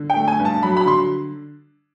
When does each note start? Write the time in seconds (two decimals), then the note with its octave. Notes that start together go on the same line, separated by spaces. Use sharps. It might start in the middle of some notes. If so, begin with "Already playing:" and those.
Already playing: D3
0.10 G5
0.16 A3
0.28 G#5
0.40 G2
0.45 A5
0.63 F#3 B5
0.77 B5
0.86 D3 C6